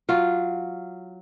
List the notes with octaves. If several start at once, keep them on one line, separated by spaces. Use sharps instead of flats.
F#3 F4